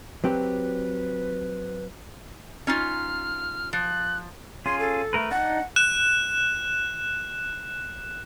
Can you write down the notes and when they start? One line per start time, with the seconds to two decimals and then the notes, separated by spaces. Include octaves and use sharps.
0.24 F#3 C4 G4 B4
2.67 C#4 D#4 F4 F6
3.73 F3 F#6
4.66 C#4 F4 G#4 C6
4.79 A4
5.13 A3 A#4 B4
5.31 D4 D#4 F#5
5.76 F#6 E7